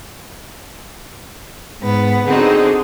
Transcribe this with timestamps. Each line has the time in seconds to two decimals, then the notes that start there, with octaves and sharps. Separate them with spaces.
1.80 G#2 B3
2.26 D3 C4 D#4 F#4 G#4